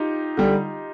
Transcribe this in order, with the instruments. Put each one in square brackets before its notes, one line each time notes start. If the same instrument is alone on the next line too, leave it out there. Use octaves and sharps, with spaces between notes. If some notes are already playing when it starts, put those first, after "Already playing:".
Already playing: [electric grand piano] D#4 F4 G4
[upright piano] D3 G3